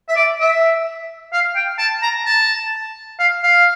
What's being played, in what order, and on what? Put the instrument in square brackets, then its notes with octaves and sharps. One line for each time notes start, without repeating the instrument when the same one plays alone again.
[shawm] E5
D5
E5
F5
G5
A5
A#5
A5
F5
F5